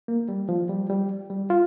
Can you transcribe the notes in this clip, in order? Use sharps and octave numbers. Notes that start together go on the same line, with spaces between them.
A#3
G3
F3
G3
G3
G3
F4